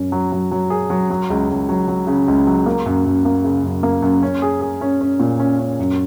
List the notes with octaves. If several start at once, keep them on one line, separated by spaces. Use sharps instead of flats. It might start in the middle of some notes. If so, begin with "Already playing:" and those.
Already playing: F#2 C#4
F#3
F#3
F#3
G#4
F#3
F#3
C#2
C#2
F#3
F#3
C#3
C#2
F#3
A#3
F#2
F#2
A#3
C#3
F#2
A#3
F#2
C#4
G#4
G#4
C#4
C#4
A#2
C#4
C#4
F#2